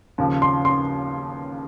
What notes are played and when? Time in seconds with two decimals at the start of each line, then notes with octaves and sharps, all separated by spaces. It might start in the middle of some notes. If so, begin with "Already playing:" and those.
0.18 D#2 C#3 F3
0.42 C6
0.65 C6